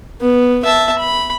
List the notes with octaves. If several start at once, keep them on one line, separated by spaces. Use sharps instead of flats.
B3
E5 A5
B5